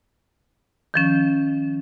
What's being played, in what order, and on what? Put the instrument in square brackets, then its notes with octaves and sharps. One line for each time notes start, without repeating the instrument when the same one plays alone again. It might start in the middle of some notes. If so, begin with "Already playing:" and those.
[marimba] D#3 F3 C#4